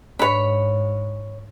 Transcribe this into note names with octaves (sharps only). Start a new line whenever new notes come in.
G#2 D4 B4 C#5 B5